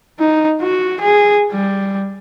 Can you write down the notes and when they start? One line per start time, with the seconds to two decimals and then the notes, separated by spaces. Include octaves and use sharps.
0.19 D#4
0.61 F#4
1.00 G#4
1.52 G3